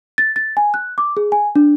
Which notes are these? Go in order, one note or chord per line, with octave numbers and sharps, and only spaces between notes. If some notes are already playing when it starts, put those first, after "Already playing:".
A6
A6
G#5
F#6
D6
G#4
G#5
D4